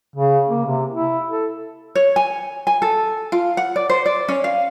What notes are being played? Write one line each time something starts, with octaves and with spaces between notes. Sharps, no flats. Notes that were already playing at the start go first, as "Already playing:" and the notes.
C#3
A#3
C3
E4
A4
C#5
G#5
G#5
A4
F4
F#5
D5
C5
D5
C#4
F5